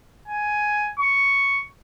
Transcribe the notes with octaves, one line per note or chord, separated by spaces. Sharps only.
G#5
C#6